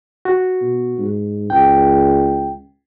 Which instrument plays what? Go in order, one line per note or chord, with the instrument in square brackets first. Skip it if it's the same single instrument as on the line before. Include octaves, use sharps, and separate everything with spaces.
[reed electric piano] F#4
[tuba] B2
G#2
[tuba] C#2 [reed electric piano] G5